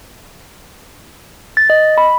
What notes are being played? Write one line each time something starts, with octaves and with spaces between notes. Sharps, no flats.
A6
D#5
B5